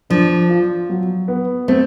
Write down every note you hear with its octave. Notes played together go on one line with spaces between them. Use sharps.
F3 D4
F4
F#3
B3
A3 C4